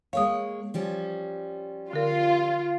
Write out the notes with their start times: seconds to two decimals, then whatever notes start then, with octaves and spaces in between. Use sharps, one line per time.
0.13 G#3 A#3 C#5 F5 D#6
0.74 F3 G3 C#4
1.93 D3 F4 A#4